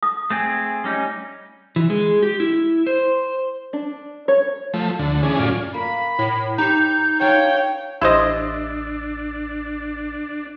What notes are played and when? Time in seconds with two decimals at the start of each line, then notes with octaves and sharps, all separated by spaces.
0.03 D#6
0.30 A3 C4 G#4
0.84 G3 C#4 D#4
1.76 E3
1.90 G#3
2.23 G4
2.40 E4
2.87 C5
3.73 D4
4.28 C#5
4.74 F3 A3
4.99 D2 D3
5.23 E3 C#4 D4 G#4
5.39 F#2 A2 C#4 F4 D5
5.74 A#3 B5
6.19 A2
6.58 D#4 G4 C5 G6
7.21 D4 F4 C#5 F#5 G5
8.01 A1 D4 E4 C5 D#5 E6